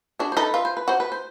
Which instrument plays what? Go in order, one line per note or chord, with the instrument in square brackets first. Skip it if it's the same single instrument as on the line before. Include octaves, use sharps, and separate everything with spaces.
[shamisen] D4 [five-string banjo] F#4 G#4
[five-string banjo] C5
[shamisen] D#4 [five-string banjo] A4 B4
[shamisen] F4 [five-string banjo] B4
[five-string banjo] C5
B4
[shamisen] F#4 [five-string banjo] C5
[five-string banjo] B4
C5